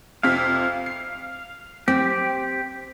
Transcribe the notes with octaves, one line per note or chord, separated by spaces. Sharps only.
F2 C3 F5 B6
C7
C4 G4